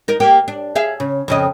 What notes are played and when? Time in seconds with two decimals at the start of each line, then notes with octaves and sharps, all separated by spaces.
0.08 D#4 A#4
0.20 A#3 G4
0.48 D4
0.76 G#4 E5 F5
1.00 C#3
1.28 F2 C#3 D#5